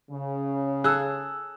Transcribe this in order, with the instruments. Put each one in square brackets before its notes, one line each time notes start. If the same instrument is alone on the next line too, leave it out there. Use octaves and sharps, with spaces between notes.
[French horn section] C#3
[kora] G#4 A4 [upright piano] E6 F#6